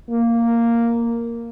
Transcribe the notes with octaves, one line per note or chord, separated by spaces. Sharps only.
A#3